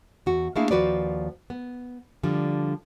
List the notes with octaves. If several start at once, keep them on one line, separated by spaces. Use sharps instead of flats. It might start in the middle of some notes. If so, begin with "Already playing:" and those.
E2 F#4
A3 A#3 D4 E4 G#4 F5
D#2 F3 F#4 B4 C5 D5
B3
D3 F3 G3